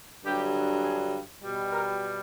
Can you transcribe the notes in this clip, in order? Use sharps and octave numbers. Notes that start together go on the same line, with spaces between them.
G2 D3 F#3 G4
G#4
B2 G3
A#4